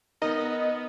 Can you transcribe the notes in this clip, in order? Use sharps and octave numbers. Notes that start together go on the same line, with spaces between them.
B3 D#4 A#4 D#5